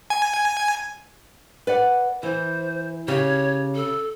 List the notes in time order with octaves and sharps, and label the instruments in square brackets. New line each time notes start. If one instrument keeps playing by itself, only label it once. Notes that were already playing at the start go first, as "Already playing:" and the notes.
[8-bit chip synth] G#5
[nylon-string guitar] B4 D5 F#5
[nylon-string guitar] E3 [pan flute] C5
[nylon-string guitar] C#3 G4 [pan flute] C#5
[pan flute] A4